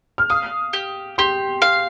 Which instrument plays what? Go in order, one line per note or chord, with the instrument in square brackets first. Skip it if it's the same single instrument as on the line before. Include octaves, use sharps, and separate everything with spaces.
[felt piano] F6
[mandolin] F5 [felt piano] D#6
[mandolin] G4
[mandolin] G4 [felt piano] C6
[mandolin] F5